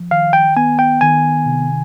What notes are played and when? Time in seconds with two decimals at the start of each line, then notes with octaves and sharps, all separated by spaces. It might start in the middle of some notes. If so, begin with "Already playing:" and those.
Already playing: F3
0.11 D#3 F5
0.33 G5
0.57 B3 G#5
0.79 G5
1.01 D#3 G#5
1.46 C3